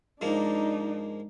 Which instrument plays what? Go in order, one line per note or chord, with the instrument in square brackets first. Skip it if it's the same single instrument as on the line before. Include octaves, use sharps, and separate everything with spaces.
[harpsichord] G#2 F3 A#3 [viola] D4 D#4